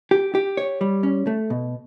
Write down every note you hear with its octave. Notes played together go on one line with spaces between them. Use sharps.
G4
G4
C#5
G3
C#4
A3
B2